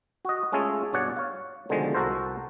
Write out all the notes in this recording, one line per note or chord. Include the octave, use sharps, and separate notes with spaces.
F#4 D#5
G#3 A3 C#4 F4 G#4 A4
G2 B2 C#5 D5 F#5
C#5 F5
B2 D3 D#3 F3 G#3 A3
C2 F#4 A4 A#4 C5